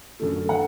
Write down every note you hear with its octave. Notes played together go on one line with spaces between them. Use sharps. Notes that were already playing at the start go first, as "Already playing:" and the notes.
F#2 D3 A3
D3 F#5